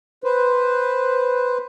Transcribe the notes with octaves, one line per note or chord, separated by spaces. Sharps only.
B4 C5